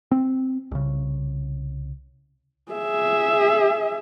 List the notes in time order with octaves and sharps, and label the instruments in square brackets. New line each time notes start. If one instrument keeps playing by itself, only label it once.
[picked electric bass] C4
C2 C#3
[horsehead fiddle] G#4 E5